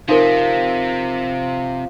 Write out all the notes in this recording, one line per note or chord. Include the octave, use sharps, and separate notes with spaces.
C3 F3 D#4 A#4